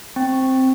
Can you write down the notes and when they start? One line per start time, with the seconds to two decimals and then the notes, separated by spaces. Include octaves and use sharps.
0.16 C4